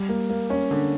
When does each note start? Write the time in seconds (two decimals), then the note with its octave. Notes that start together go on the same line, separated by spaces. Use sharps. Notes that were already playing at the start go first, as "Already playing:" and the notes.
Already playing: G3
0.09 A#3
0.29 A#3
0.50 C#4
0.71 D3